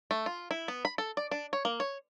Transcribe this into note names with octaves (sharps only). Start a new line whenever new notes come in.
A3
F4
E4
B3
B5
A4
D5
D4
C#5
A#3
C#5